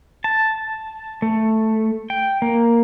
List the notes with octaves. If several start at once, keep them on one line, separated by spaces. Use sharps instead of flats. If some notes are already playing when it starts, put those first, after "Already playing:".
A5
A3
G5
A#3